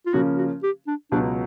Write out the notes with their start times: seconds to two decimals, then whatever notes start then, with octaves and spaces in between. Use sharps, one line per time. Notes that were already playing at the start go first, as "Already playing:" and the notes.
0.06 F4
0.13 C#3 F3 A#3 C#4 F#4
0.37 F#4
0.63 G4
0.87 D4
1.11 C#2 B2 F#3 D4